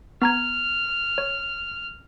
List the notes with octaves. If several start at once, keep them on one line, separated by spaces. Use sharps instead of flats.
B3 A#5 F6 G#6
C#5